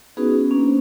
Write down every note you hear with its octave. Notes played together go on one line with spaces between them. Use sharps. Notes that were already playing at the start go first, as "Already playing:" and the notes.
B3 C#4 D#4 F#4 G#4 B4
C#4
A#3 C#4 D4
C5